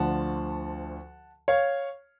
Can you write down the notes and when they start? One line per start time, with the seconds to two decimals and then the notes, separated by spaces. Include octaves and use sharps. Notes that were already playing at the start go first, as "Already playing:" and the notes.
Already playing: D2 D3 F3 F#5 A5
1.48 C#5 F5